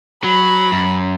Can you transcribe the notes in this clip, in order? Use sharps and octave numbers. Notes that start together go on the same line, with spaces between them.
F#3 B5
F#2